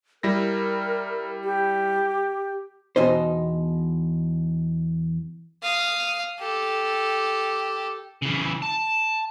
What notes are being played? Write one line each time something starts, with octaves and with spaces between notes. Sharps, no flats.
G3 E4 A#4 A#6
G4
E2 B2 D#4 C5
F5 D#6
G4 A4
C#3 E3
A5